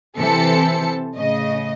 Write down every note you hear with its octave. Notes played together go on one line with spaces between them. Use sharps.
C3 E3 C4 A4 A5 C#7
A2 C#3 D#5